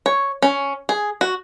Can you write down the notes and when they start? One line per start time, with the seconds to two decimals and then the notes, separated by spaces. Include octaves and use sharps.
0.06 C#5
0.42 C#4
0.89 G#4
1.21 F#4